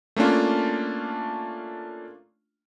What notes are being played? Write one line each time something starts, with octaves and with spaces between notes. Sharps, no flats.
A3 A#3 C#4 D4 F4